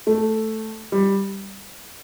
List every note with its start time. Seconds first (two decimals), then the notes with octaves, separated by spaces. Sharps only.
0.07 A3
0.92 G3